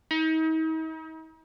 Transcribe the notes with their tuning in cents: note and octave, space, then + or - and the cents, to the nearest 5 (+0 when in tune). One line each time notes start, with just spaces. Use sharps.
D#4 +40